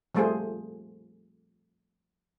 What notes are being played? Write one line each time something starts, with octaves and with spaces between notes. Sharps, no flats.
F3 G3 A3 F4 G#4 C5